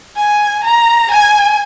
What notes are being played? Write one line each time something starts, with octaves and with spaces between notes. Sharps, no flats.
G#5
A#5
G#5